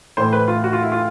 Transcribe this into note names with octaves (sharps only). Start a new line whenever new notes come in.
A2 E3 A3 C5
B4
F4
F#4
F4
E4
F4